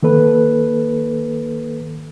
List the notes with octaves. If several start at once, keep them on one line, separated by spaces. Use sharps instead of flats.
D#3 A#3 A4 B4